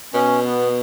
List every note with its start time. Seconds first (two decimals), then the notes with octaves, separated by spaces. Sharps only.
0.14 B2 C#4
0.42 B3